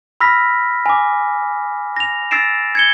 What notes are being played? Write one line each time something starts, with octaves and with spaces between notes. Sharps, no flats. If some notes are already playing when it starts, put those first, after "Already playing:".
B5 E6 F6 A#6 B6
G#5 D6
A#6 F7
E6 A6 A#6 C7 D7 E7
G#6 C#7 G7